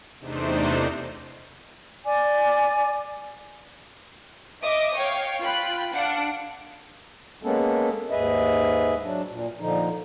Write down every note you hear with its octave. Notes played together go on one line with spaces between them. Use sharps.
E2 C3 A3 D4 D#4 C5
D5 G#5 D6
D#5 E5 D6 D#6
C#5 F5 G5
F4 G5 B5 F#6
D4 F5 F#5 D7
G#3 A#3 B3 C#4 A4
D#2 G#2 G#4 B4 D#5 E5
F#3 D4
A#2
A#2 D3 F3 D#4